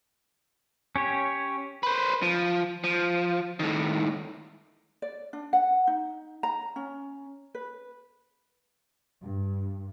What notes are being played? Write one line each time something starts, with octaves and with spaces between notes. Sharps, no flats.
C#4 G4 C#5
B4 C5
F3
F3
A2 D#3
D5
D4
F#5
D#4
A#5
C#4
B4
G2